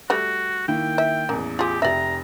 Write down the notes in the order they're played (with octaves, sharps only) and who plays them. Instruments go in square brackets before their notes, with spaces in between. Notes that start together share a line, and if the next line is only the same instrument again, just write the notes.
[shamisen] G3 A3 [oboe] F#4
[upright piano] D#3 A#3 E4 [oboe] G5
[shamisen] E5
[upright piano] A1 E2 [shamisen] A#3
[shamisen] F4 G#4 [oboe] G4
[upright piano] F1 G4 [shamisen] D5 E5 [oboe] A#5